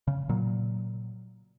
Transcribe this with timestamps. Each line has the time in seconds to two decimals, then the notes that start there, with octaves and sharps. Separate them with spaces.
0.08 C#3
0.29 A#2 F#3